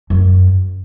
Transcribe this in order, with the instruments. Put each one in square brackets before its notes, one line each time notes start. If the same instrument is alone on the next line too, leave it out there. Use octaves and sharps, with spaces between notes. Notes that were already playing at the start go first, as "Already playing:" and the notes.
[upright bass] F#2